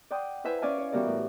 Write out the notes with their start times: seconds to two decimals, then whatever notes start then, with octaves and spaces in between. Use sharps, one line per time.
0.11 D5 F#5 G5 C6 D#6
0.44 E4 B4 C5 E5 G#5
0.62 C#4 D5 F5 G#5
0.78 C#5
0.92 E3 F#3 G3 B3 A#4 D5
1.07 A2